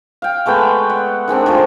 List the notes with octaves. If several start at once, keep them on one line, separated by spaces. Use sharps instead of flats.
F5 G5
G#3 A3 B3 G5
D5 F#5
D#3 G#3 C4 D4
D#3 F3 A3